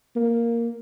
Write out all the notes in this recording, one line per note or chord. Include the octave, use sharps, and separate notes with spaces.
A#3